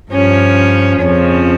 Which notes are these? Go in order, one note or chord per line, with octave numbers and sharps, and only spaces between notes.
G2 F3 C#4
F2 C#3 F3 C#4